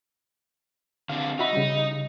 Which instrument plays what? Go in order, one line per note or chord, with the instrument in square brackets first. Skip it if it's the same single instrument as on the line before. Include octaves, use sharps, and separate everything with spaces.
[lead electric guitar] D3 C4 [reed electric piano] F5
[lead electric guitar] D#4 [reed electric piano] F#4 E5 B5
[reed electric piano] C#3 G3